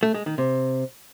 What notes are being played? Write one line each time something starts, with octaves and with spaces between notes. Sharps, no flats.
A3
G#3
D#3
C3